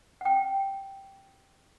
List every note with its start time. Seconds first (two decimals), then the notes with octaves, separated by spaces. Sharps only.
0.21 F#5 G5